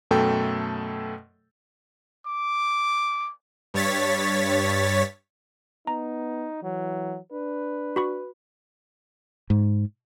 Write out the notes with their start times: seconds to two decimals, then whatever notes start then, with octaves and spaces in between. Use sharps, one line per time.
0.11 F#2 B2 A3 A4 G5
2.27 D6
3.74 G2 C#5 A6 B6
5.87 B3 D#4 A#5
6.62 E3 F#3
7.32 D4 B4
7.96 F#4 B5 C#6
9.50 G#2